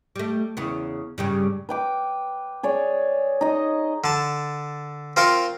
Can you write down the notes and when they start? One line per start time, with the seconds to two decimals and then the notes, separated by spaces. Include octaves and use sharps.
0.16 G3 A3
0.57 E2 C#3 B3
1.18 G2 C#3 G3
1.69 B4 G5 D6
2.63 G#4 C#5 D5
3.41 D#4 D#5
4.04 D3 A5
5.16 C4 F4 A#4 F5 C6 C#6